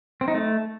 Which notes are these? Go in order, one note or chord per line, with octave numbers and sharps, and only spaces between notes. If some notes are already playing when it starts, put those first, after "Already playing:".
C4
D#4
A3